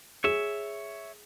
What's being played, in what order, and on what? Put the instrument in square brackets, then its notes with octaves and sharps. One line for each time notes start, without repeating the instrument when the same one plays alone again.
[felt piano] G#4 [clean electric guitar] C#5 E5